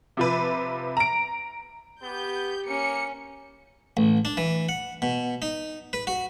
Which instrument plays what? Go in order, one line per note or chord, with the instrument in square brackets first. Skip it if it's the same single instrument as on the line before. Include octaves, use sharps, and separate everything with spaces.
[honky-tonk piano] C3 F3 B4
A#5 D7
[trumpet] B3 [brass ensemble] G4 [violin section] G6
[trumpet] A#3 [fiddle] C#4 [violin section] C#7
[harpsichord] A1
D4
E3
F#5
B2
D#4
B4
F#4